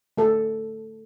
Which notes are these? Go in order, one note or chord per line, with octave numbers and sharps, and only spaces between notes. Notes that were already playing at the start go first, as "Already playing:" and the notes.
A3 A4